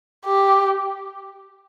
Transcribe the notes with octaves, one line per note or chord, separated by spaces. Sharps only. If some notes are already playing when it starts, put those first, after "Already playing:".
G4